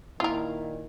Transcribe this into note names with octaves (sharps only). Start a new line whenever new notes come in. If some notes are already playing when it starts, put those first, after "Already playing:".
A#2 D#3 E4 F4 A#4